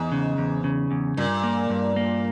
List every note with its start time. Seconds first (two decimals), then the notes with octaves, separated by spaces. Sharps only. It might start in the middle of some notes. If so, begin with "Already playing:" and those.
Already playing: E2 G#2
0.12 C#3
0.38 E2
0.64 C#3
0.91 E2
1.17 G2 A#2
1.43 A#3
1.70 G2
1.96 A#3